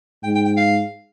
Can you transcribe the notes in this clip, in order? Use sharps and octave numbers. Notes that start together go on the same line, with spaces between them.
G#2 G5
G5
G5
F5